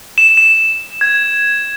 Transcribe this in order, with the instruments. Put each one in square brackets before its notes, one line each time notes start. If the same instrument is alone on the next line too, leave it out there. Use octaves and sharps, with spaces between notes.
[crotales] E7
E7
G#6